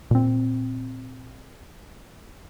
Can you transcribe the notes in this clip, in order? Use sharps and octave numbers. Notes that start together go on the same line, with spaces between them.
A#2 C4